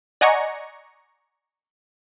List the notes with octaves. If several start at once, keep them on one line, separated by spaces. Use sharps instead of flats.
D5 D#5 F#5 G#5 A#5 C#6